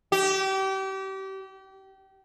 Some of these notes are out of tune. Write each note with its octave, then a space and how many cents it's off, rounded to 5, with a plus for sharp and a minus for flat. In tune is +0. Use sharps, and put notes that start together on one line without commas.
G4 -30